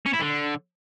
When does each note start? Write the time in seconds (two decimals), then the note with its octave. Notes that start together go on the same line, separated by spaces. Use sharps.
0.06 C#4
0.14 E4
0.21 D3